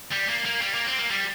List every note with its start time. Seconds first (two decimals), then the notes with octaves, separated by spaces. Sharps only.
0.12 G3
0.30 A#3
0.45 A#3
0.62 G3
0.74 A#3
0.87 C4
0.99 A#3
1.11 G3